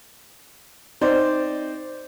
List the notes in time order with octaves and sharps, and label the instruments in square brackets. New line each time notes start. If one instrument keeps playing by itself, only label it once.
[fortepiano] C4 D#4 C5 D5